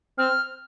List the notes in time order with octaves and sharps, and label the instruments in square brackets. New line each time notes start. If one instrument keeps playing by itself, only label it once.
[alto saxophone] C4 [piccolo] F6